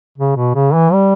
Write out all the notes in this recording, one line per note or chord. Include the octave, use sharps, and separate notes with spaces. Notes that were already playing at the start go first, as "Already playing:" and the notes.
C#3
B2
C#3
E3
G3